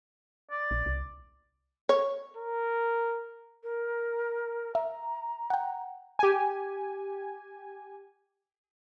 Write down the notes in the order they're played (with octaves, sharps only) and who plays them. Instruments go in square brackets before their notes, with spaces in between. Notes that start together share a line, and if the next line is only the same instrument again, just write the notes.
[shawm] D5
[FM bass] A#1
C2
[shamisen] C#5
[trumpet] A#4
[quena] A#4
[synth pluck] E5 [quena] A#5
[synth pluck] F#5 G5
[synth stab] G4 G#5